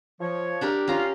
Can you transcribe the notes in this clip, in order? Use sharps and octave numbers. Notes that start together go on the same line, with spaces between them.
F3 C#5
D4 G4 A#4
C#4 F4 A#5